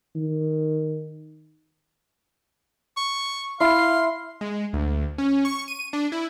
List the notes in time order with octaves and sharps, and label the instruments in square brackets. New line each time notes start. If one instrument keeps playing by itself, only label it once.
[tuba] D#3
[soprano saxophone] C#6
[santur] E4 [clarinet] F5 [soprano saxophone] C6
[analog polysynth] G#3
D2
C#4
C#6
D#7
D4
E4